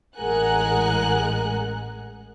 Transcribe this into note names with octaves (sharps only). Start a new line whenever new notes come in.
A1 G#3 A#4 F#5 G#5 F#6